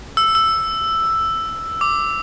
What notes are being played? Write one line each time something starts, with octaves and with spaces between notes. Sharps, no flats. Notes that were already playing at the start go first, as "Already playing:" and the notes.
E6
E6
D6